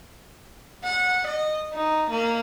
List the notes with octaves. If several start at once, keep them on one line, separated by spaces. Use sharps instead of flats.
F#5
D#5
D#4
A#3